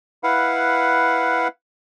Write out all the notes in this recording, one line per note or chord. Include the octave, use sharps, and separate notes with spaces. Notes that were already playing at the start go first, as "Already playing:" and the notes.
E4 B4 F5 F#5